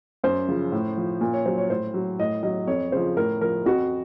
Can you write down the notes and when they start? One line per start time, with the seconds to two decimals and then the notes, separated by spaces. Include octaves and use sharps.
0.24 F#2 C5
0.48 C#3 F3
0.72 A2
0.97 F3
1.21 A#2
1.33 C#5
1.45 F#3 C5
1.58 C#5
1.70 A2 C5
1.94 F#3
2.19 A2 D#5
2.43 F#3 D#5
2.67 F2 C#5
2.92 C#3 F3 C5
3.17 A2 A#4
3.41 F3 A#4
3.65 F2 F#4